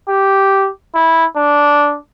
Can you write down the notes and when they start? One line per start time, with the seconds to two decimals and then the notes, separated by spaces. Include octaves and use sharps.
0.09 G4
0.95 E4
1.37 D4